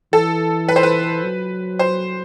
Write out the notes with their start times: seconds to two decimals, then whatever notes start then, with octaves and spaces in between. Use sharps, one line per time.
0.13 E3 A4
0.68 B4
0.76 C5
0.83 B4
1.23 F#3
1.79 C5